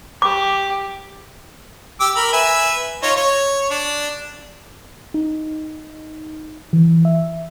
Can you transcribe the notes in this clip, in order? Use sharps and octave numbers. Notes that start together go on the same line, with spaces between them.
G4 D6
G4 D6 E6
A#4 B5
B4 E5 G#5
D#4 F4 C#5
C#5
D4
D#4
E3
E5